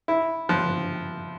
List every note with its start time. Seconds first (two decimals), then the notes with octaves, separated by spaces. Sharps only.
0.08 E4
0.49 F3